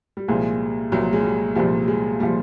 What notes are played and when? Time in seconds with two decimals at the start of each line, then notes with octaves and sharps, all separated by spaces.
0.17 G3
0.28 C2 A#2 F3 G#3
0.92 C2 A#2 F3 F#3
1.13 G#3
1.24 G3
1.55 C2 A#2 F3 G3
1.88 G#3
2.20 A#2 F3 G3